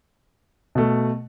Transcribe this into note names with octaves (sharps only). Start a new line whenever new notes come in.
B2 A3